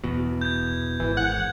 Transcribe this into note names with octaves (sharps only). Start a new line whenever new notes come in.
E2 B2
G6 G#6
G#1 E3
F#5 G#6